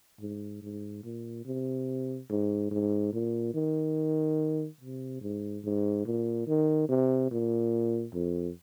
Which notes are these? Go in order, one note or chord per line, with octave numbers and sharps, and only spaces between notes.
G#2
G#2
A#2
C3
G#2
G#2
A#2
D#3
C3
G#2
G#2
A#2
D#3
C3
A#2
F2